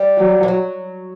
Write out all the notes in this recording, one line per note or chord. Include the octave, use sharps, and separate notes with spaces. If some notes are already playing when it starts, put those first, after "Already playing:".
Already playing: G3
F#3
E3
F#3